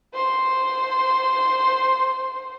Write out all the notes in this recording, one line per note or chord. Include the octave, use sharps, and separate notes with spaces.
C5 C6